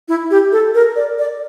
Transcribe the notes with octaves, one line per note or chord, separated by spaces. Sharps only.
E4
G4
A4
A#4
D5
D5